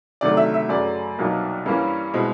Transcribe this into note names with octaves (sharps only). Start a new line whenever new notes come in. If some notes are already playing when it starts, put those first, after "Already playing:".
D2 C3 D#3 F#3 A3 D5
E5
E5
F#2 C#3 F#3 A3 D5
C2 B2 F#3 A#3 D#4
G2 E3 G3 A#3 C#4
B2 G#3 C4 E4